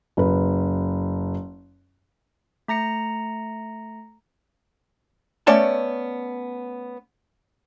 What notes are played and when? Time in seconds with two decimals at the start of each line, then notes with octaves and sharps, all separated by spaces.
0.17 F#1 B4
2.68 A3 A#5 A#6 C#7
5.47 A3 B3 C#4 D5 G#5 A5